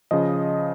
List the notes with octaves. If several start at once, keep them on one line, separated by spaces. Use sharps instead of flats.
C#3 F3 D#5